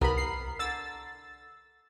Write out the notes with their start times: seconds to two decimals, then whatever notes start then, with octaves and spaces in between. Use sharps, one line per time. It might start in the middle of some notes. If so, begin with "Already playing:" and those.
0.01 C2 B3 A#4 B5
0.17 C7
0.59 D3 E6 A6